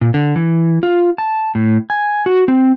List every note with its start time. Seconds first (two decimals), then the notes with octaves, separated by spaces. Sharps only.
0.01 A#2
0.14 D3
0.36 E3
0.83 F4
1.18 A5
1.55 A2
1.90 G#5
2.26 F#4
2.48 C4